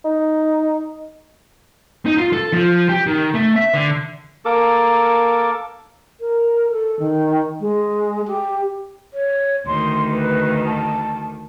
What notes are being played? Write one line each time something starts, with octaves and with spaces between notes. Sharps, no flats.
D#4
D#4
F4
A4
F3
G4
D#3
A3
E5
D3
A#3 A4 A#4 D6
A#4
A4
D#3
G#3
G4
C#5
D2 D#3 C6
B4
A5